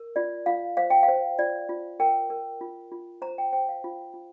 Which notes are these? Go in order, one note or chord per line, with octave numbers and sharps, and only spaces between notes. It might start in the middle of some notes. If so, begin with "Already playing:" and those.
Already playing: A#4
F4 D5
F4 F5
C5 F5
G5
F5
C5
F4 D5
F4
A#4 G5
A#4
F4
F4
C5 A#5
G5
C5 G5
F5
F4
F4